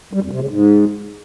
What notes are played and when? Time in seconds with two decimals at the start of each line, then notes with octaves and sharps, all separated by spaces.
0.13 G3
0.22 F2
0.31 C3
0.40 C#3
0.49 G#2